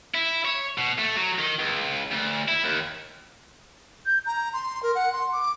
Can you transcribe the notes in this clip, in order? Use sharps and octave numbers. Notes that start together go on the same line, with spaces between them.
E4
C#5
B2
A3
F#3
D#3
C#2
D2
E4
D#2
G6
A#5
C6
A#4
F#5
C6
D6